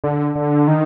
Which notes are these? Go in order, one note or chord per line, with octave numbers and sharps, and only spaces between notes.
D3
D3
D#3